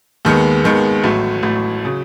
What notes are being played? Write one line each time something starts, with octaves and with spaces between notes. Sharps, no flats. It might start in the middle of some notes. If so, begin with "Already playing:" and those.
D#2 D#3 G#3 B3
D#2 D#3 G#3 B3
A1 A2 F#3 A3
A1 A2 F#3 A3
C#3 F#3